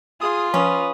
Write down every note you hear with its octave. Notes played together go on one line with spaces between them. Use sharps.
F4 G#4 D#6
F3 C#4 B4 D#6